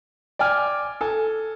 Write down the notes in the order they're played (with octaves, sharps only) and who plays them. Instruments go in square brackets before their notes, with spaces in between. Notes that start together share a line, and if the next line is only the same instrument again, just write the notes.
[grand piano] D5 G5 G#5 F6
A4 G#5